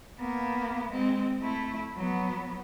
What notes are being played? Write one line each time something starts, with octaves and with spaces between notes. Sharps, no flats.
A#3 B3
G#3 C4
A3 E4
F#3 B3